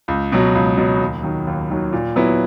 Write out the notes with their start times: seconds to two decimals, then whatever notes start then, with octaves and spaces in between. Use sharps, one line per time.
0.08 C#2
0.32 B2 F#3
0.55 C#2
0.77 B2 F#3
1.01 D#2
1.23 D#3 F#3
1.47 D#2
1.70 D#3 F#3
1.93 A#2
2.16 F#3 B3 E4